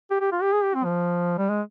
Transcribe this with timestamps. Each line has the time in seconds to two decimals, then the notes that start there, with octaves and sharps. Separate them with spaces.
0.11 G4
0.21 G4
0.32 F4
0.42 G4
0.53 G#4
0.63 G4
0.74 C4
0.85 F3
1.38 G3
1.50 G#3